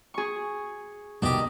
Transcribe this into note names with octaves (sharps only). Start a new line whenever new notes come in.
G#4 C#6
C2 F2 B2 D#3 D4 G4 D#5